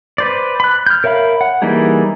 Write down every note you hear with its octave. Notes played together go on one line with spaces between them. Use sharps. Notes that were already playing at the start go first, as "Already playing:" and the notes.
B4 C5 D5
B5 F#6
F6 G6
A#4 C#5 E5 F5 B5
F#5
E3 G3 A#3 D#4 G#4